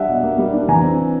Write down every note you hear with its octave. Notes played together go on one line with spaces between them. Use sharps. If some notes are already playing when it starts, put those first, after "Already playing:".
Already playing: G3 D4 E5 F#5
B2
A#3
G3
D4
E3 G#5 A#5
C4